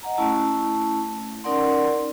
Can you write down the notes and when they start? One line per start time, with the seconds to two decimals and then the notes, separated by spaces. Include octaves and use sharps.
0.03 D#5 F#5 A#5
0.17 A3 C#4 E4 A5
1.44 C#4 D#4 A#4 D5 F#5 C6